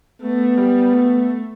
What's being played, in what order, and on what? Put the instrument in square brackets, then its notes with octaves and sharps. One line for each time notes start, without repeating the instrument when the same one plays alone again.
[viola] A3 [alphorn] B3
[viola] G3
A3